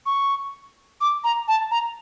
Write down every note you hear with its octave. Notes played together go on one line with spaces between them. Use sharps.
C#6
D6
A#5
A5
A#5